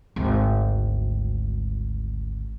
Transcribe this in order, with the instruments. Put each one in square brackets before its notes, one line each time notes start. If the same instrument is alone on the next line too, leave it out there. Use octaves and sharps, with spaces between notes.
[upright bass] G#1 D2